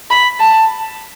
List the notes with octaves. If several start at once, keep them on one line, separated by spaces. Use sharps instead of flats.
B5
A5